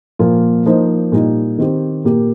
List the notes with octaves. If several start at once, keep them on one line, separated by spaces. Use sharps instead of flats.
A#2 F3 A#3 F4
F3 A#3 D#4 C5
A#2 G3 D#4
D#3 C4 G4
A#2 A#3 G4